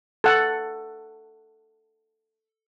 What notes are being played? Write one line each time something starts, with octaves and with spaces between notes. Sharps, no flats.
A4 F#5